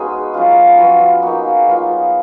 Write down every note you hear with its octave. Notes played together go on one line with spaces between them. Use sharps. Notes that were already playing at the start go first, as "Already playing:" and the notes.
Already playing: G#3 B3 C#4 D#4 F#4 G#4
F#3 C#4 F4
F3 B3 F4 F#4
F4
A#3 D#4 F#4
G#4
F#3 B3 F4